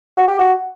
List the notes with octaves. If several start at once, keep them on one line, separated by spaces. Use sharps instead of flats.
F#4
G4
F#4